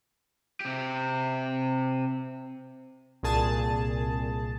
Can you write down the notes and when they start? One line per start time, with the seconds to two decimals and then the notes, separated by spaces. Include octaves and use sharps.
0.60 C3 G4
3.23 C2 A#2 G#4 A5